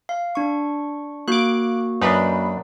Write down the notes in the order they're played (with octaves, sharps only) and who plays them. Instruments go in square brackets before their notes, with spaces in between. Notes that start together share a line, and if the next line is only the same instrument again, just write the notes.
[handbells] F5
D4 C#6
[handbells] A#3 F#4 [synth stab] D6 F#6
[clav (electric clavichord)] F#2 D4 [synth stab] D#4 B4 B5